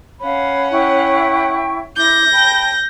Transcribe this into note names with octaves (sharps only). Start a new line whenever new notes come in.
C#4 F5 F#5 B5
E4 G5 C#6
E4 D6 G6 A#6
G5 A5 B5